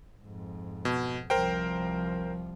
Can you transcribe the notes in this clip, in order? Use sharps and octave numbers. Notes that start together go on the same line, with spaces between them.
F2 G#2
B2
C2 F3 A#4 C5 G5